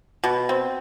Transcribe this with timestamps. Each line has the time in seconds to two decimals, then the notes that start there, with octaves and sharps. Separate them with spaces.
0.24 B2
0.49 C4